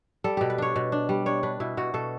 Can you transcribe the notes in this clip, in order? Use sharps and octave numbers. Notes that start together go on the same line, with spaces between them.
G3 A4
B2 G4
B4
D4 C#5
B2
D4
G3
D4 C#5
D4 B4
B2 E4
B2 F#4
B2 A4